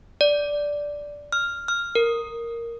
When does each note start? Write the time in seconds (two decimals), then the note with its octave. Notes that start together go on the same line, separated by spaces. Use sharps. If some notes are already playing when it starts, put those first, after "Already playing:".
0.21 D5
1.32 F6
1.68 F6
1.95 A#4